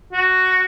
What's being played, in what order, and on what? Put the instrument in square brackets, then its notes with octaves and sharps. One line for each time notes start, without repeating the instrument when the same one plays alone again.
[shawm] F#4